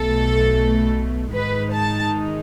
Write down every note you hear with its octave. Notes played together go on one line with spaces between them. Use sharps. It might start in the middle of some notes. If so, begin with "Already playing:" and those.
Already playing: B1 B2 A3 A4
G#2 D#3 G#3 D#4 B4
A5